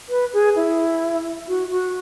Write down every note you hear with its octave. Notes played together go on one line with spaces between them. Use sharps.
B4
G#4
E4
F#4
F#4